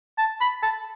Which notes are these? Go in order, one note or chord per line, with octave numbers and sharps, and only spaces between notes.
A5
B5
A5